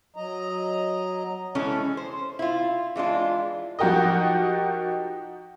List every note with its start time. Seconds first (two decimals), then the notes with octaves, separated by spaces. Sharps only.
0.16 F#3 D#5 A#5
1.55 E3 G#3 C#4 A4
1.97 C5
2.39 E4 F4
2.96 E3 G#3 D4 F4
3.79 F3 D#4 F#4 G4 A#4 D#5